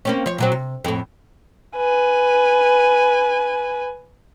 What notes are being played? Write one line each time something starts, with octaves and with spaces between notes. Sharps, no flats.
A#3 C4 C#4
F3 C#5
A#2 F#3 C4
C3
F2 A2
B4 G#5